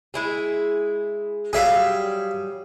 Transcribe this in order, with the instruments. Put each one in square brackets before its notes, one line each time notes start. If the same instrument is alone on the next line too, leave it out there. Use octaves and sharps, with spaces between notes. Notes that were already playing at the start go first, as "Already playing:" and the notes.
[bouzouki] G#3 E4 G#4
[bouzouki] F#3 G3 [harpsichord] G#4 E5 F5